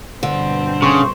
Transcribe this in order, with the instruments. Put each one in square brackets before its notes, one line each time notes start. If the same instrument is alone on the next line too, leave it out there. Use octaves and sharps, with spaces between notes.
[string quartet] G2 B2 C4 [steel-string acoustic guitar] D3
[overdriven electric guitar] C#3 [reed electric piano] C6 C#6